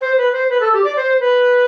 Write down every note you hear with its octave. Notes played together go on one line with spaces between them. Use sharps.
C5
B4
C5
B4
A4
G4
D5
C5
B4